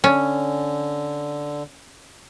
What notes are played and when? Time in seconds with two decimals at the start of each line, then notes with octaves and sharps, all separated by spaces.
0.04 D3 C#4